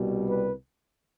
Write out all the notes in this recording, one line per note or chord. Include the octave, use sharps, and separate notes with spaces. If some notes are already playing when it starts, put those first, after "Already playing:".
Already playing: C2 B2 G3
B4